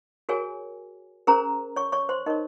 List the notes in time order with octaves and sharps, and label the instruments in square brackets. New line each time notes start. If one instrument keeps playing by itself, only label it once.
[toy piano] F#4 G#4 A#4 C#5 G#5
C#4 G#4 A#4 C5 A#5
C#5 C#6
C#5 C#6
C5 C6
D#4 A#4 C#5 D#5